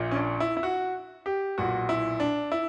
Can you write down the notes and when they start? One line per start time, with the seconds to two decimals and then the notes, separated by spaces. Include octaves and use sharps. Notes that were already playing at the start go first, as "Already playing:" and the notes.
Already playing: A#1 A#2
0.11 C#4
0.16 D4
0.40 E4
0.57 E4
0.63 F#4
1.26 G4
1.58 B1 A#2 F#4
1.89 E4
2.20 D4
2.52 E4